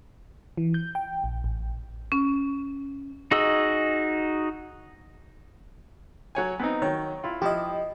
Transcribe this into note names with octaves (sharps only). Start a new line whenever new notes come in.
E3
G6
G5
A#1
A1
C#4
D#4 F#4 G#4 D#5 E6
F#3 C#5 G#5
B3 C4 D#4
D#3 F#3 C#5
E4 F4
F3 E4 G4 D#5